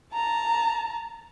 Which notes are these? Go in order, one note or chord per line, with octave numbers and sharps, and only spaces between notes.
A5 A#5